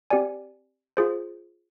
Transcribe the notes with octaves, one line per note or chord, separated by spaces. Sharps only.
C4 G4 D5 G#5
F4 G#4 C5